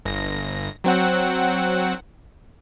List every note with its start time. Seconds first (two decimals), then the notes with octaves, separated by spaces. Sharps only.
0.05 G1 A#6
0.84 F#3 C4 F#5